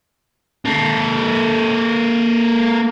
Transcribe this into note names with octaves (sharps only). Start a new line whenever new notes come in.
A#3 A4